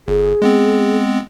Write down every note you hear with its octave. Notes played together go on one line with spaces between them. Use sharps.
G1 G#4
G#3 B3 C4